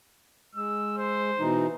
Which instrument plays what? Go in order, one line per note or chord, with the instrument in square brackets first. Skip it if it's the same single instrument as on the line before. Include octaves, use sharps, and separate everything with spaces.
[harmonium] G#3 [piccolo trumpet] E6
[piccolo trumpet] C5
[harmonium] B2 E3 D#4